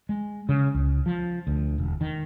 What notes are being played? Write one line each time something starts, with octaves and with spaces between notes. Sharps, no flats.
G#3
C#3
C#2
F3
D2
E1
D#3